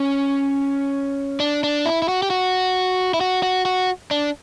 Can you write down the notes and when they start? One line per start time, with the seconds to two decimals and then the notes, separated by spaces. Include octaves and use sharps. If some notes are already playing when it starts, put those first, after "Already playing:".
Already playing: C#4
1.40 D4
1.64 D4
1.86 E4
2.02 E4
2.08 F#4
2.22 G4
2.30 F#4
3.14 E4
3.21 F#4
3.43 F#4
3.65 F#4
4.11 D4